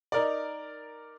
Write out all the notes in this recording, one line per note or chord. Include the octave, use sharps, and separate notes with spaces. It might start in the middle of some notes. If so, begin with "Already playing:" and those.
D#4 A#4 D5